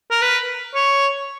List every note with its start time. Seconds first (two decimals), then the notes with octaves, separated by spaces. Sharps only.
0.11 A#4
0.22 B4
0.75 C#5